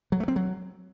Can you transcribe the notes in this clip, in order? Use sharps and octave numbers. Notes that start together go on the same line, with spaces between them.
F#3
A3
C4
F#3